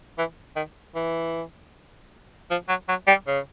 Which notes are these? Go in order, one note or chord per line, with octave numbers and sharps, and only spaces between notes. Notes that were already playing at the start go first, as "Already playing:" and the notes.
E3
D#3
E3
F3
F#3
F#3
G3
C#3